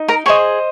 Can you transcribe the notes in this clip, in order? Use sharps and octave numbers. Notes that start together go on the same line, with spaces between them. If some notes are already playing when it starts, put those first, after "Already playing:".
Already playing: D#4
A#4 A#5
G#4 C5 C#5 D#5 C#6